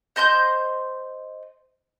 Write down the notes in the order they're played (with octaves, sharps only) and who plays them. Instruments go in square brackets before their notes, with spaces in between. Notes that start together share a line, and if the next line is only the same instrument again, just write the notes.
[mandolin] C5 D#5 C6 G6